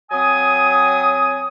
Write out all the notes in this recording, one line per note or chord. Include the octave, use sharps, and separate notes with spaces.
F#3 C4 G#5 D#6